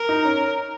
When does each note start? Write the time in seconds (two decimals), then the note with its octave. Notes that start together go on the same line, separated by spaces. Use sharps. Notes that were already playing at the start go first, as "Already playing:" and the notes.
Already playing: A#4
0.09 D#4
0.25 C#4